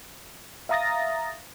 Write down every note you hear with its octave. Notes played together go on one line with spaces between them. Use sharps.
E5 F5 A#5 D#6 A6 A#6